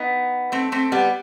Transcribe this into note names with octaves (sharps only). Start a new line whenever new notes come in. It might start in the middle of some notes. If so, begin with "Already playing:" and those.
Already playing: B3 D#4
A3 C4
A3 C4
G3 B3